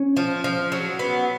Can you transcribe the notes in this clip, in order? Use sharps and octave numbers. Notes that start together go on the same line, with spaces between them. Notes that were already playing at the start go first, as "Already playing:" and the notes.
Already playing: C#4
F3
F3
F#3
B3